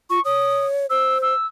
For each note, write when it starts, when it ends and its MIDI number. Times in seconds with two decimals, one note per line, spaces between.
0.10 0.19 65
0.10 0.23 85
0.25 0.86 73
0.25 0.66 87
0.90 1.34 72
0.90 1.18 88
1.22 1.46 88